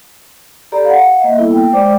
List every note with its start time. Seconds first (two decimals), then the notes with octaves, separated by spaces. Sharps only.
0.72 G4 A4 D5 A#5 B5
0.85 F5 F#5
1.20 A#3 D#5 E5
1.38 G3 A#3 B3 E4 A4
1.53 G5
1.73 G#3 C5 D5 G5 D6